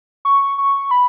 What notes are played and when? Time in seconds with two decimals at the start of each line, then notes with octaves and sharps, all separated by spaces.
0.25 C#6
0.58 C#6
0.91 B5